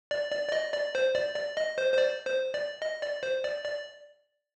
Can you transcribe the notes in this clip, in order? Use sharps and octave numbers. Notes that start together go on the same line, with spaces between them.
D5
D5
D5
D#5
D5
C5
D5
D5
D#5
C5
C5
D5
C5
D5
D#5
D5
C5
D5
D5